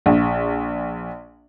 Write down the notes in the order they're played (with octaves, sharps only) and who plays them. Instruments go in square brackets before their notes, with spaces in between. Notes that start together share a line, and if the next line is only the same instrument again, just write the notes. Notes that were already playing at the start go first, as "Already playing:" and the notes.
[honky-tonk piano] A#1